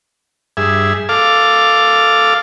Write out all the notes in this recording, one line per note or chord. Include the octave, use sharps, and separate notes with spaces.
G2 G#4 E5
A4 F5 D6